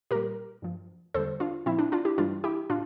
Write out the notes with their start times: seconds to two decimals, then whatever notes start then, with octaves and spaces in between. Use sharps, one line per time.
0.11 A#2 G3 G4 A#4
0.62 G2 F3
1.14 E2 D3 G3 A4 C5
1.40 D4 F4
1.66 A#2 F3 C4 E4
1.79 D4
1.92 D4 F4
2.05 E4 G4
2.18 G2 E3 G3 D4 F4
2.44 E4 G4
2.70 A2 D4 F4